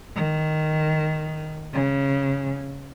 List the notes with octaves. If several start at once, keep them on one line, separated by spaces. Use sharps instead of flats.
D#3
C#3